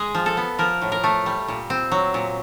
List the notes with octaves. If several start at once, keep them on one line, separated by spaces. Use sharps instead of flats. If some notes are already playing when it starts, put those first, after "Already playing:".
Already playing: G#3 G#4
F3
A4
B3
F3 A#4
A2
A#4
A3
G3
A#2
C4
F#3
A#2